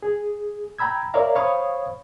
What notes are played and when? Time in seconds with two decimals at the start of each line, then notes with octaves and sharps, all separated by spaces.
0.03 G#4
0.78 G5 A#5 B5 E6 G#6
1.14 A#4 C#5 D5 E5 F5 A#5
1.35 C5 C#5 F5 B5 C#6 D#6